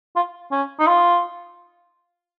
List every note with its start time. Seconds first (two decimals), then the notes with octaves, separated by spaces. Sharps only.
0.16 F4
0.51 C#4
0.79 D#4
0.87 F4